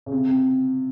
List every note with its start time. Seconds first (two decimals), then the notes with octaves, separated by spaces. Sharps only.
0.06 C#3
0.12 C3
0.29 C3